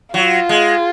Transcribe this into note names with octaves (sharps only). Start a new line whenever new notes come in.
F#3 F4
G#3